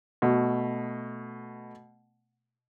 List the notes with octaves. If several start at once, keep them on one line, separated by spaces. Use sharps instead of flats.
B2 A3